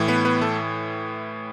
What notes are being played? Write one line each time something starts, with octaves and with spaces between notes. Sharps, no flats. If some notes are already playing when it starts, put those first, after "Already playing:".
Already playing: A2 E3
B3 B4
B3 B4
A3 A4